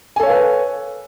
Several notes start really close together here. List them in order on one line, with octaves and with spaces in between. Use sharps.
G#5 A4 C#5 F5 B4